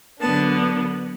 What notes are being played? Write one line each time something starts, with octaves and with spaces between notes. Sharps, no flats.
D3 F#3 B3 D4 A5